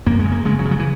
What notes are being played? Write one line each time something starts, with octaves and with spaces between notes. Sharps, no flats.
F#2 A#3
G#3
C#3
A#3
C#3 G#3
F#3
C#3
F#3
E3